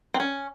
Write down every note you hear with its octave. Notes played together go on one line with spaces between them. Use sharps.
C4
C#4